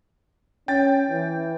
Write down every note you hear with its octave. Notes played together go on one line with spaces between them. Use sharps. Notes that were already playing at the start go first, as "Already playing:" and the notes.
C#4 G5 A6
E3